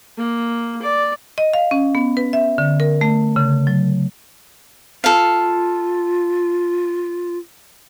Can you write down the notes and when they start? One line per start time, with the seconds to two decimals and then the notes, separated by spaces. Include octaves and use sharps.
0.17 A#3
0.82 D5
1.38 D#5
1.54 F5
1.71 C#4
1.95 B3
2.17 B4
2.33 E5
2.58 D3
2.80 A#4
3.01 A3
3.36 C#3
3.67 F#3
5.04 F4 A4 F5